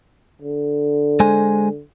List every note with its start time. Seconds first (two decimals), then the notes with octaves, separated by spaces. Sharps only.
0.42 D3
1.20 G#3 C5 G#5